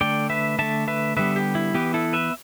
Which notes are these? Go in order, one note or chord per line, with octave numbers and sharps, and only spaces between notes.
D3 A3 D5 G5
B4 E5
D3 A3 E5 A5
B4 E5
D3 G3 B3 B4 E5
G4
E4
E3 B3 G4
E4 A4
B4 E5